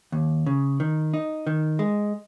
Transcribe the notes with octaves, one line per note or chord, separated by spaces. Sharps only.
D#2
C#3
D#3
D#4
D#3
G#3